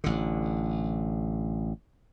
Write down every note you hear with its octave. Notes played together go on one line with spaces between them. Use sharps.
A1 D3